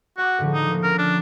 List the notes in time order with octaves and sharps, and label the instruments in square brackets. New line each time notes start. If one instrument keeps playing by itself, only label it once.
[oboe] F#4 [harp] F#5 C#6 D6
[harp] A2 D3 F3
[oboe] D#4
[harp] F3 A#3
[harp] C#4 [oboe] A#4
[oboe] D4